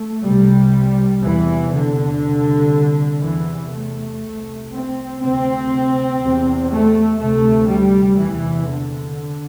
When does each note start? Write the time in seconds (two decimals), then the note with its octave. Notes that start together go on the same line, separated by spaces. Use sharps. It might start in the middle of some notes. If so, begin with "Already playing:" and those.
Already playing: A3
0.23 C2 C3 G3
1.23 E2 C3 E3
1.73 D3
2.23 C2 C3
3.22 E2 C3 E3
3.72 A3
4.21 C2 C3
4.71 C4
5.21 D2 C3 C4
6.21 E2 C3
6.71 A3
7.20 D2 C3 A3
7.69 G3
8.19 E2 C3 E3
8.69 D3